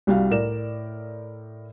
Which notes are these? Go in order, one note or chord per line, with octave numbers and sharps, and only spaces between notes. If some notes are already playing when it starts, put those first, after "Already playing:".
C2 G3 F#4 F5
A2 A#4 D5 E7